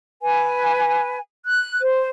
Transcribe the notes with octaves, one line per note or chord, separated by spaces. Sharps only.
B4 G#5
F#6
C5